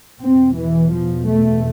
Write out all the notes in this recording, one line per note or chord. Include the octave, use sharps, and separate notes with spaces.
E2 B2 C4
E3
F3
A3